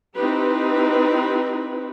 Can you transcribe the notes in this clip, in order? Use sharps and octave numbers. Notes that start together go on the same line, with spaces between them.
C4 D#4 E4 G4 B4